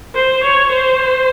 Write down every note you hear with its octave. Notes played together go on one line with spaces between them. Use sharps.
C5
C#5
C5